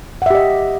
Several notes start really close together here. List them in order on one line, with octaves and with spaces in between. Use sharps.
F#5 E5 G4 D#5